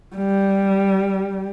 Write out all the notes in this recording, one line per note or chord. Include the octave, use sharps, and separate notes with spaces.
G3